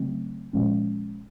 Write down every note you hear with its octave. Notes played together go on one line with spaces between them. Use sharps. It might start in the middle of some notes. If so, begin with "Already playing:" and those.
Already playing: C#3 F#3 A3 C4
A#2 F3 G#3 C#4